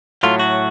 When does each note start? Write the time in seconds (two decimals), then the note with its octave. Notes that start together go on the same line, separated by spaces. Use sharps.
0.23 A2 F#3 A3 F4
0.40 F#4